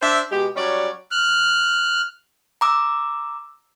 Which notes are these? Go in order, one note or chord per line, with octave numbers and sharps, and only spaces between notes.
D4 C5 E5
B2 G#3 G4
F#3 G3 C#4 C#5 D5
F6 F#6
A#5 D6 E6